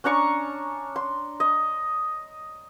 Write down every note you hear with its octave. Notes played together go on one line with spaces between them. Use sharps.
C#4 D4 A#5 C#6
C6
D#5